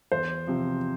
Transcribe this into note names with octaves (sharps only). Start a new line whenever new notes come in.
E2 C5
C3 F3